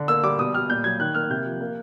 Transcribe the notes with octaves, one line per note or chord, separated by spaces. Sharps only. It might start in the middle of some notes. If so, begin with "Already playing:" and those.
Already playing: D3
A#3 E6
G3 D6
B2 D#6
G3 F6
A#2 G6
F#3 G#6
D#3 F#6
A#3 F6
C3 G6
F3
A#3